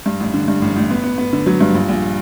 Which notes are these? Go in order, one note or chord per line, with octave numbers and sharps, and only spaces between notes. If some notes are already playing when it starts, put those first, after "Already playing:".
G2
A1
D3
G2
A1
A1
B3
B3
B3
D3
F#3
G2
A#1
A#1